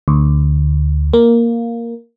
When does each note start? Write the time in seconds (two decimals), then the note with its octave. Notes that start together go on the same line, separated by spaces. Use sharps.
0.08 D2
1.14 A#3